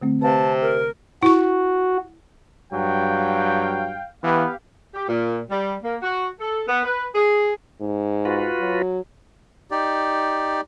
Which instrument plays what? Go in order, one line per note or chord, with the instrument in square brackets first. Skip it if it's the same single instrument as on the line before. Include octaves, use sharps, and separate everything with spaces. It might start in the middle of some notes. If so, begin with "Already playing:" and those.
[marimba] D3 A3 C4
[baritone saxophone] C3 [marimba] B4 F5 G#5 [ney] A5
[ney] A#4
[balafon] E4 C#6 [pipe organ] F#4
[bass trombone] G2 [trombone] F#3 [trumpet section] F5 G5
[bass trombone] E3 [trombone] B3 [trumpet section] G4 F5
[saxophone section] G4
A#2
G3
A#3
F#4
A4
B3
B4
G#4
[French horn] G#2
[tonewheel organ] F4 F#4 B4
[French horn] F#3
[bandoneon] D#4 G4 D5